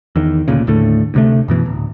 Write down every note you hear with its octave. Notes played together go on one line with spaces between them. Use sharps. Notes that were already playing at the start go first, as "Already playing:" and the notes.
E2 D#3
G#1 D2 A#2 C#3
D#2 A2 D3 A3
D2 C3 A3
F#2 B2 E3
D1